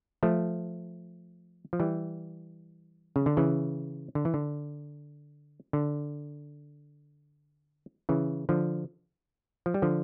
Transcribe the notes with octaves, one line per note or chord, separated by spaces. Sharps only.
F3 A3
F3
E3 G3
C#3
D3
C#3 E3
D3
E3
D3
D3
C#3 E3
D3 F3
F3
G3
D3 F3